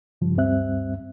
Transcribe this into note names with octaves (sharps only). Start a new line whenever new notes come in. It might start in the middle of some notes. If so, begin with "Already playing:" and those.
G2 C#3 F3 G3
D2 G2 G3 C4 E5 F#6